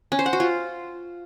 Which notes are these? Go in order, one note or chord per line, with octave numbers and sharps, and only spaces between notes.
C#4
C5
F#5
F#4
F4